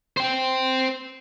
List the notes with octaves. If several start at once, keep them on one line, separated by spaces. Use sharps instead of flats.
C5 G5